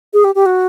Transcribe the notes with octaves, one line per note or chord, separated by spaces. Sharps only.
G#4
G4
G4
F#4